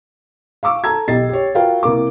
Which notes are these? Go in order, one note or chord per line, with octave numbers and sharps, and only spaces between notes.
F5 C#6 D6 E6
A4 A5 A#5 E6 G#6
B1 G4 D#5 A6 C7
G4 C#5
F4 F#4 A#4 B4 F5 G5
C2 A#3 A#4 D6